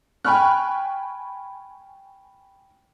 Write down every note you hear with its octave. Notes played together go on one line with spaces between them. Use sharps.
G5 G#5 B5 C#6 F6 F#6